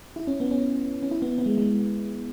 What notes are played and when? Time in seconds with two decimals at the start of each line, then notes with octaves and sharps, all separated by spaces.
0.16 E4
0.27 C#4
0.40 B3
0.51 C#4
1.03 C#4
1.11 E4
1.22 B3
1.38 B3
1.46 G#3
1.58 G#3